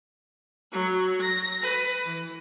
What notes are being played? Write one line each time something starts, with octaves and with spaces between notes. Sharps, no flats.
F#3
A#6
B4
E3